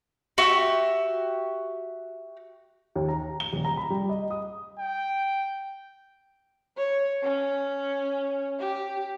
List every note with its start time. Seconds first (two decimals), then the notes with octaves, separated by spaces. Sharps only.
0.38 F#4 G4 E5
2.95 D#2
3.09 A#5
3.40 G7
3.53 D#1
3.65 A#5
3.77 B5
3.90 G3
4.09 D#5
4.30 D#6
4.79 G5
6.77 C#5
7.23 C#4
8.59 G4